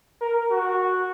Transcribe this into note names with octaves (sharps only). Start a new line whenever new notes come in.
A#4
F#4